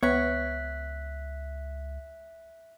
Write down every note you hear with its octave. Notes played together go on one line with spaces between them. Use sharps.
C#2 B3 C#5 E5 F#6 B6